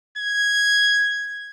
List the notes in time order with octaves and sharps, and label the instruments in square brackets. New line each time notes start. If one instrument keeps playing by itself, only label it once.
[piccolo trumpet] G#6